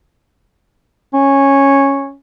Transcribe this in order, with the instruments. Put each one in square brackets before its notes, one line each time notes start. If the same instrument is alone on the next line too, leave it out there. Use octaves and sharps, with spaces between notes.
[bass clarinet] C#4